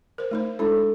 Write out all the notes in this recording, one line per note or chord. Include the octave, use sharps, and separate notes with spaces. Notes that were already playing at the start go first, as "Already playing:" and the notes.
A#4 C5
A3 D#4 C5
G#3 D4 E4 A4